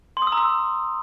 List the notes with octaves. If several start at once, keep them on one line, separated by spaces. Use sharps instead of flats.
C6
D#6
E6
A#5
E6